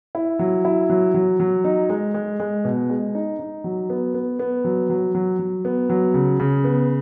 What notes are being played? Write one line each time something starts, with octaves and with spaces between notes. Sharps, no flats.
E4
F#3
E4
F#3
F#3
F#3
D#4
G#3
G#3
G#3
B2
G#3
D#4
D#4
F#3
B3
B3
B3
F#3
F#3
F#3
F#3
B3
F#3
C#3
C#3
B3